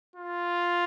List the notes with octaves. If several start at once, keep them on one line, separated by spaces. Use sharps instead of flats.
F4